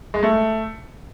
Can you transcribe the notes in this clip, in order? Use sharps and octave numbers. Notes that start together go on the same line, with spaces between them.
G#3
A3